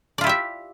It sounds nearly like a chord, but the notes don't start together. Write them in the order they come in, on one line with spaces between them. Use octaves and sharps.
D5 F4 E4 G4 E5